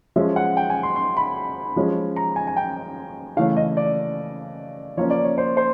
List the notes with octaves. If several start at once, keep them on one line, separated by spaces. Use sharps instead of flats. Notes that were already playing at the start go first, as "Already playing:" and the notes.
F3 G#3 C#4 E5
F#5
G5
G#5
C6
C6
B5
F3 G#3 C#4
A#5
G#5
G#5
G5
C#3 E3 A3 C#4 F5
D#5
D5
F3 A#3 C#4 C#5
D5
C#5
C5
C5